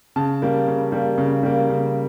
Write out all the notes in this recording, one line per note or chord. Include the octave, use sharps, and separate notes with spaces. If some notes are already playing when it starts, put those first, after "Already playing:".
C#3 A5
G3 A#3
C#3
G3 A#3
C#3
G3 A#3
C#3